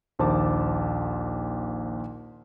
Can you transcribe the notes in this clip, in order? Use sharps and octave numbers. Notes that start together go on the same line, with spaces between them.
A#1 D#2 C5 A5 D6